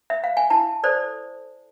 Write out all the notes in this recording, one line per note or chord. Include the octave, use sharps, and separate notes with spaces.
E5
F5
G#5
E4 A5
A4 C5 D5